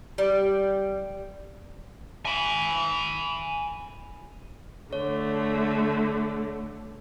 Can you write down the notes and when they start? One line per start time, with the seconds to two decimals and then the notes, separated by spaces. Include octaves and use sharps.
0.18 G3
2.26 G#5 B5
4.93 D3 A3 C#5